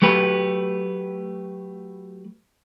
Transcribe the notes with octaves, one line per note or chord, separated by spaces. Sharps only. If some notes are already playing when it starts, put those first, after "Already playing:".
F#3 A3 G4 B4